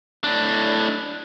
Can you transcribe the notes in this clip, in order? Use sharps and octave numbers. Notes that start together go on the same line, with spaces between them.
A2 D4